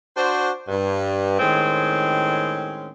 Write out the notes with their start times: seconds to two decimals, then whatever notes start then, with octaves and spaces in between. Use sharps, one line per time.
0.16 D4 F#4 C5
0.68 G2
1.39 A2 D#3 G#3 C4 C#4